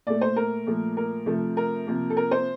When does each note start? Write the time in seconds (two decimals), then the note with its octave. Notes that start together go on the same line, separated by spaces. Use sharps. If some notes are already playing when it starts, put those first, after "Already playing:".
0.07 A#2 A3 D5
0.21 C5
0.36 A#4
0.66 A#2 F3 A3
0.97 A#4
1.26 C3 F3 A3
1.57 A#4
1.87 C3 F3 A#3
2.10 A4
2.17 A#4
2.31 C5